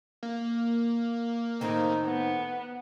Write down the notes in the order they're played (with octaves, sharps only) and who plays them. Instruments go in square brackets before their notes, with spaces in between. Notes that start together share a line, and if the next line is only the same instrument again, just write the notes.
[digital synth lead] A#3
[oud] A2 D#3 C4 [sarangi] D#4
[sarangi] B3